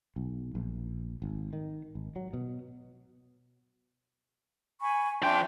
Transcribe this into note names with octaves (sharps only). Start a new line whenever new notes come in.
B1
A#1
G#1
D#3
G#1
F#3
B2
G#5 B5 C#6
F3 D4 E5 G5 C6